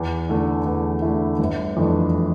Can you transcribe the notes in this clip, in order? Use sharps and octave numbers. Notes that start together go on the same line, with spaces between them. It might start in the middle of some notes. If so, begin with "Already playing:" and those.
Already playing: E2
D3 A3 E4
E2
D3 A3 E4
G1
F2 E3 A3 D4